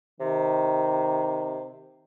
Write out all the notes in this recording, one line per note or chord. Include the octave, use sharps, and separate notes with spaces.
C3 D#3